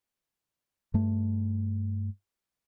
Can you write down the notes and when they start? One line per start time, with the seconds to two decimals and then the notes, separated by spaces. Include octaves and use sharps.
0.94 G2 A3